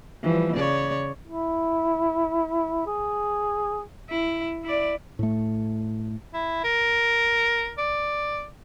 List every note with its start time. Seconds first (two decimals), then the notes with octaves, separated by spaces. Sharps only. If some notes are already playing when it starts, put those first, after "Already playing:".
0.23 E3 F3 G3
0.55 C#3 C#5 D5
1.27 E4
2.87 G#4
4.10 E4
4.64 E4 D5
5.19 A2 A3
6.33 E4
6.64 A#4
7.78 D5